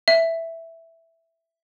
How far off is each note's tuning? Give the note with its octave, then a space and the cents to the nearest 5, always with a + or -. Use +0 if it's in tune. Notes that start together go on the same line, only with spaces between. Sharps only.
E5 +0